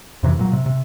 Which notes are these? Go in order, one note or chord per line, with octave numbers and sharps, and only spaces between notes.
F2 C3 E3
A#2 F#3
C3
C3